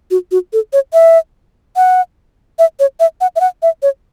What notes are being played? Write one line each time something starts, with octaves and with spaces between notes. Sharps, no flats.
F#4
F#4
A4
C#5
E5
F#5
E5
C#5
E5
F#5
E5
F#5
E5
C#5